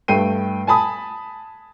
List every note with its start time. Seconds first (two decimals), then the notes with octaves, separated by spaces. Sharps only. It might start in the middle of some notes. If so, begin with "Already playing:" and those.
0.08 G2 A3 G5 C7 D#7
0.67 G#5 A5 B5 D#6